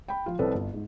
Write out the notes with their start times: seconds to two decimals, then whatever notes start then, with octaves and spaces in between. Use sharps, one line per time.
0.08 G5 B5
0.26 F3 F4
0.39 C2 C4 A4 B4 C#5
0.54 G1
0.73 G#2